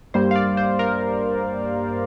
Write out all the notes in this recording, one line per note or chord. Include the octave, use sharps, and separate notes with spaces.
G2 G3 A#3 C5
F5
D5
C5
A#4